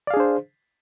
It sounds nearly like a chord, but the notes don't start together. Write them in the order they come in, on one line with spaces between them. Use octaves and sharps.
D5 F5 G#4 D4 C5